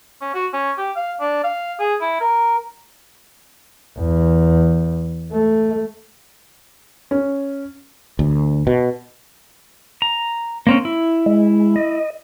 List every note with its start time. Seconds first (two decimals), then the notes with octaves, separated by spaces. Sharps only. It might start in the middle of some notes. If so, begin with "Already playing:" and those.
0.21 C#4
0.34 F#4
0.53 C#4
0.78 G4
0.96 F5
1.20 D4
1.44 F5
1.80 G#4
2.01 E4
2.20 A#4
3.98 E2
5.32 A3
7.11 C#4
8.19 D2
8.67 B2
10.02 A#5
10.67 A#3 C4 C#4
10.85 E4
11.26 G#3
11.76 D#5